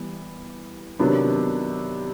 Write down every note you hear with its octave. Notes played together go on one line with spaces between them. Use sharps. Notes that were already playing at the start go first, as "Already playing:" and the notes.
Already playing: E3 G3 B3
C3 D#3 F#3 B3 D4